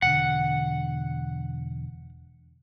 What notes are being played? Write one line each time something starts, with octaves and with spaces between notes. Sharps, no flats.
E1 D3 F#5